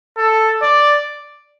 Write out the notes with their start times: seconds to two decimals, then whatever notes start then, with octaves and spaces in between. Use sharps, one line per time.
0.17 A4
0.62 D5